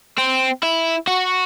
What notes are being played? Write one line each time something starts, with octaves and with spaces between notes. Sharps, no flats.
C4
E4
F#4